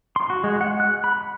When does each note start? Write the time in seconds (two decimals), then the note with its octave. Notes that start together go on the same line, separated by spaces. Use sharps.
0.16 C6
0.30 F#4
0.44 G#3
0.61 F#5
0.80 F#6
1.04 B5